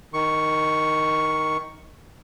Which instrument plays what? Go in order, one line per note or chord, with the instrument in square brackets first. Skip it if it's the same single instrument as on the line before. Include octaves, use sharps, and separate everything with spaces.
[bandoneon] D#3 C#6